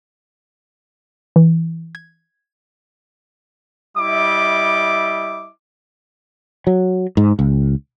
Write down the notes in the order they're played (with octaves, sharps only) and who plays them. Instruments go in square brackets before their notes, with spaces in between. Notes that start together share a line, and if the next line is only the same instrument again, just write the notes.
[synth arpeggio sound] E3
G#6
[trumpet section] G3 E4 D#5 E5 D6
[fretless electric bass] F#3
G#2
C#2